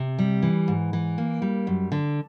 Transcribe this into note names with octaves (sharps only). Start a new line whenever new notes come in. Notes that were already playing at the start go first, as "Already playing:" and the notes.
Already playing: C3
G3
E3
G#2
E3
A#3
G3
F#2
D3